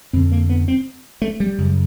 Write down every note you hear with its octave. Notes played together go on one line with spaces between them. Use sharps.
F2 D3 C4
A#3
B3
C4
A3
G3
F#2 C#3